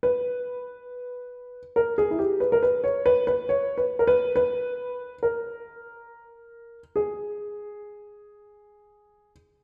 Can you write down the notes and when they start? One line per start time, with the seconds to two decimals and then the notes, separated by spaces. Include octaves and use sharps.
0.03 B4
1.76 A#4
1.98 G#4
2.11 E4
2.19 G4
2.40 B4
2.52 A#4
2.63 B4
2.84 C#5
3.06 B4
3.27 B4
3.49 C#5
3.78 B4
3.99 A#4
4.07 B4
4.36 B4
5.23 A#4
6.96 G#4